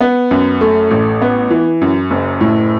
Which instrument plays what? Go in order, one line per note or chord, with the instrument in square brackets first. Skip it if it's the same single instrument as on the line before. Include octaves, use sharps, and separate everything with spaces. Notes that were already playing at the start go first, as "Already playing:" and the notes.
[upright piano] B3
F#2
A3
A1
B3
E3
F#2
F#1
A2